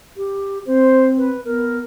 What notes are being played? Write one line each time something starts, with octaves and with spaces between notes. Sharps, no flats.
G4
C4 C5
B4
B3 A#4